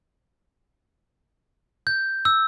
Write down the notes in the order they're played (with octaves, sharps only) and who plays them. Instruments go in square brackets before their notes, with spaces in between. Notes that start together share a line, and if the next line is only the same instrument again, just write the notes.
[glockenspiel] G6
E6